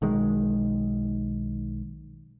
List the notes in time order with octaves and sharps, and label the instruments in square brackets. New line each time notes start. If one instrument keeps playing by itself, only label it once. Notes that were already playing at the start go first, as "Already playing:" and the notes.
[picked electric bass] B1 D#3 G#3